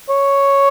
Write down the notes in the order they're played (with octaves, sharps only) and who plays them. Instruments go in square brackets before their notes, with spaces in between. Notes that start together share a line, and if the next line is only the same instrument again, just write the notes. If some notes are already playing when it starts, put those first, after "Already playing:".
[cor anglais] C#5